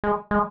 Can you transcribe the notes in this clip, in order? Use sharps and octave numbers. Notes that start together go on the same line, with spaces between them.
G#3
G#3